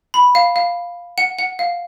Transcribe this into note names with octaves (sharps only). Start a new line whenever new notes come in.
B5
F5
F5
F#5
F#5
F5